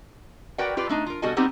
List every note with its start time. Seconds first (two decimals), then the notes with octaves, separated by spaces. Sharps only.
0.58 F#4 A#4 B4 D5 F#5 G5
0.77 F4 G4 B4 D5
0.89 A3 D4 D#4
1.06 F4 A#4
1.22 B2 G3 F#4 A4 D#5 G#5
1.36 G3 B3 C4 D#4 G4